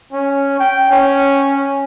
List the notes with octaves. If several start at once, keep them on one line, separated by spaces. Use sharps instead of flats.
C#4
G5
C#4